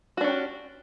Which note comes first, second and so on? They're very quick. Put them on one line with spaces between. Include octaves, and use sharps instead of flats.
F#4 D4 C#4 G4